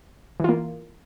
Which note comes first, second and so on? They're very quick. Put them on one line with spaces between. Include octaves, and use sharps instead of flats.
E3 F4 A#3